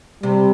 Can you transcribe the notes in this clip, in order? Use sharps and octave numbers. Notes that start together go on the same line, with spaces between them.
C3 G3